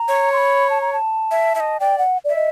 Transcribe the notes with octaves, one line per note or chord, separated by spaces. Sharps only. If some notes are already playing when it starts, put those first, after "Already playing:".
Already playing: A#5
C#5
C6
B5
A5
A#5
A5
E5
E5
D#5
D5 G5
F#5
D5 E5
D#5